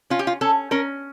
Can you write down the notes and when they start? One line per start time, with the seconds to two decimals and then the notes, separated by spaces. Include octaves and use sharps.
0.10 C#4 F4
0.19 G4
0.27 F4
0.41 C#4 A4
0.71 C#4 A#4